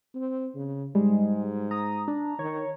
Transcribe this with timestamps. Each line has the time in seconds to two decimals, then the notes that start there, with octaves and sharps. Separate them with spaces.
0.15 C4
0.55 C#3
0.95 G#2 G3 G#3
1.71 A#5 D#6
2.08 D4
2.39 D#3 C#5